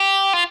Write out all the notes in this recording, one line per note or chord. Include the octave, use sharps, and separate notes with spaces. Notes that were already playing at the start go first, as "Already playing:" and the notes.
Already playing: G4
F4